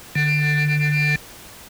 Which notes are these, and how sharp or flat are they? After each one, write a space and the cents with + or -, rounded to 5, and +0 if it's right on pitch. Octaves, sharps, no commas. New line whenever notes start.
D3 +20